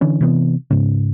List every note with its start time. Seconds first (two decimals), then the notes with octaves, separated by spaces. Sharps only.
0.01 D3 E3 C#4
0.21 C3 E3 B3
0.71 G#2 C#3